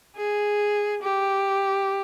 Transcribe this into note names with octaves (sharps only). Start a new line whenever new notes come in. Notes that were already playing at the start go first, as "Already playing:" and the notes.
G#4
G4